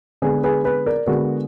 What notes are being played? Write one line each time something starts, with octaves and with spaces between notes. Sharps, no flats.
D3 G#3 B3 G#4 B4
G#4 B4
G#4 B4
A#4 D5
D3 G#3 B3 F#4 A#4